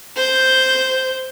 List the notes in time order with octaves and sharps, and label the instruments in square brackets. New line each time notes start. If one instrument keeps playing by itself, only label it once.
[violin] C5 G6